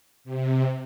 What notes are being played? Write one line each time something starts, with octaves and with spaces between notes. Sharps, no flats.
C3